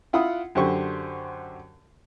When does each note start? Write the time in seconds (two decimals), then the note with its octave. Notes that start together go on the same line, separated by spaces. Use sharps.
0.13 E4 F4 F#5 B5 D#6
0.55 F#2 D3 G4 C5 C#6